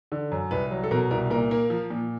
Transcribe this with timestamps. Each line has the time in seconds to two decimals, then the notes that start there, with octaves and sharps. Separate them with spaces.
0.12 D3
0.31 F#2
0.51 C2 B4
0.71 F#3
0.83 A4
0.91 B2 A#4
1.11 C2 A#4
1.30 A#2 A#4
1.51 A#3
1.70 F3
1.90 A#2